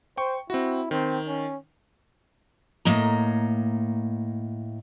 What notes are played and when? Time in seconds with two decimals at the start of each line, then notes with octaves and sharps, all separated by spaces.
0.17 C5 G5 C#6
0.50 C4 E4 F#4
0.91 D#3 C4
1.28 C#4
2.85 A2 A#3 D#5 A#5